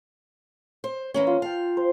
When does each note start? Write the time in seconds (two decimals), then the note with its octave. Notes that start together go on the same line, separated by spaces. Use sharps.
0.84 C5
1.14 E3 A#3 C#4
1.27 F4
1.42 F5 G5 A5
1.77 C5